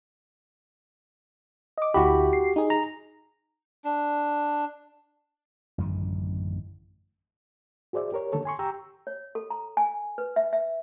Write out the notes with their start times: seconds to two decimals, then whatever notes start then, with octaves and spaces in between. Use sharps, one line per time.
1.78 D#5 D6
1.94 D2 E4 F#4 G4 B5
2.33 C7
2.56 D#4 G#4
2.70 A#5
3.85 D4
5.78 A1 F#2 D3 D#3
7.93 F#4 G#4 C5 D5 E5
8.12 G4 A#4 C#5
8.32 D3 D#3 A#3 A4 C#5
8.45 G#5 C6 C#6
8.59 G4 G5 A#5 C#6 E6
9.07 C#5
9.35 A4
9.50 A#5
9.77 G#5
10.18 B4
10.36 E5
10.53 E5